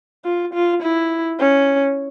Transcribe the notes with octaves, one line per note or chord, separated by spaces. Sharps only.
F4
F4
E4
C#4